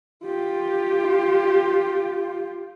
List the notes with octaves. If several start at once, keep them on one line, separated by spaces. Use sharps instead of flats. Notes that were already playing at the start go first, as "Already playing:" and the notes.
F4 G4